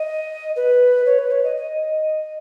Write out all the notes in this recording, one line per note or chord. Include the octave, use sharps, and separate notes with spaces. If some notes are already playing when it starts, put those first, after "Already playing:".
Already playing: D#5
B4
C#5
B4
C#5
D#5
D#5